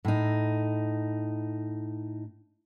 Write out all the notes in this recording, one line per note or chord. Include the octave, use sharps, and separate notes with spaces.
A2 D#4